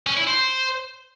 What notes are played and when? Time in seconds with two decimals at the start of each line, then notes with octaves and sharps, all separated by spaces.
0.06 C#4
0.17 E4
0.28 C5